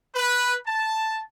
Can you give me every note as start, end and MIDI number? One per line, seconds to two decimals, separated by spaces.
0.15 0.57 71
0.66 1.22 81